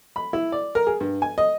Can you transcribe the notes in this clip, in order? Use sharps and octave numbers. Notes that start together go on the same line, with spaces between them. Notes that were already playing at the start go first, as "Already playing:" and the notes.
B5
E4
D5
A#4
G#4
G2
G#5
D#5